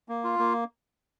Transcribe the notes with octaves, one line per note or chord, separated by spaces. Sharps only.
A#3
F4
A#3